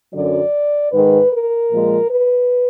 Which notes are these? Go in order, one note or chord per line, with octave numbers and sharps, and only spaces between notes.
F#2 D3 F#3 D5
G#2 D#3 G#3 B4
A#4
A#2 F3 G#3
B4